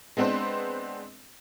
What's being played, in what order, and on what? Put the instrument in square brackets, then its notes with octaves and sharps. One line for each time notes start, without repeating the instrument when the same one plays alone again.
[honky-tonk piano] G#3 B3 C4 D4 B4 C5